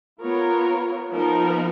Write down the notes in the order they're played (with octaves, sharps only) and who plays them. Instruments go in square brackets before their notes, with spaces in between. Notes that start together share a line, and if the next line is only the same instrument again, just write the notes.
[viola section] B3 F4 A#4 C#5
F3 B3 D#4 A#4